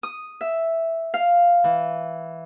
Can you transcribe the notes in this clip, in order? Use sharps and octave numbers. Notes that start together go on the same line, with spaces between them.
D#6
E5
F5
E3